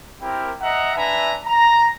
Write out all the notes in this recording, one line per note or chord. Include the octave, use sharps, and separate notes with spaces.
C4 E4 G4 A#4
D#5 E5 F#5 A#5
D4 B4 E5 G#5 A#5
A#5